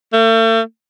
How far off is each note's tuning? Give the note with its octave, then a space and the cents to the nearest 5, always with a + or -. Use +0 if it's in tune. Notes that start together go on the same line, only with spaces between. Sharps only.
A3 +40